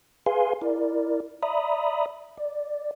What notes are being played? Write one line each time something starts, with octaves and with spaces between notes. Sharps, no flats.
G#4 B4 F5 G#5 C6
E4 A#4 D5
D5 E5 A#5 B5 D#6
D5